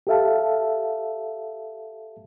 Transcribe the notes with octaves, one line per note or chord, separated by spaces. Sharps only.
G4 A4 E5 F5 A5